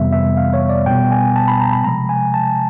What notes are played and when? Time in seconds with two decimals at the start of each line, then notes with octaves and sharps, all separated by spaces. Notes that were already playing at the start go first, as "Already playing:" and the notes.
Already playing: F2 C3 E3 G3 B3 E5
0.12 E5
0.37 F5
0.54 C#5
0.69 D5
0.86 B2 G3 B3 G5
1.11 G#5
1.36 A5
1.48 B5
1.61 A#5
1.73 B5
1.84 C3 F3 G#3 A#5
2.09 G#5
2.34 A5